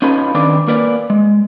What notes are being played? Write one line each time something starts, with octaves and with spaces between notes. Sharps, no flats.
C#4 D#4 F4 A4 B4
D#3 C4 D4 B4 D5
A#3 A#4 B4 D5
G#3